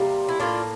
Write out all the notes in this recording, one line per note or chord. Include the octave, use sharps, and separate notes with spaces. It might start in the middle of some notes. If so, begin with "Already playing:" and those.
Already playing: C3 G3 A#3
E4
A2 G3 A#3 D4 F4